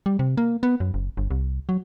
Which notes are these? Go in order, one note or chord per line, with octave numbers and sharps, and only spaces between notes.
G3
C3
A#3
B3
F#2
F#1
G1
C2
F#3